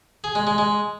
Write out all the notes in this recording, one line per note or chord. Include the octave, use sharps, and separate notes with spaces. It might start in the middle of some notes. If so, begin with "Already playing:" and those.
G#4
G#3
G#3
G#3